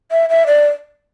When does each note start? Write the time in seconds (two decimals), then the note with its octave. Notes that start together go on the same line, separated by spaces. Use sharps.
0.11 E5
0.30 E5
0.47 D5